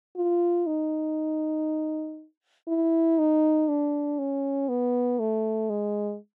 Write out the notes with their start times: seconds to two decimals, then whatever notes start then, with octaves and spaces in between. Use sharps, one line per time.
0.16 F4
0.67 D#4
2.68 E4
3.18 D#4
3.69 D4
4.19 C#4
4.69 B3
5.19 A3
5.70 G#3